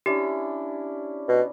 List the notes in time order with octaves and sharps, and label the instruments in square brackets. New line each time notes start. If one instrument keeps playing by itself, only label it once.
[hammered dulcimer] C#4 D4 E4 [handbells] G4
[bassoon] B2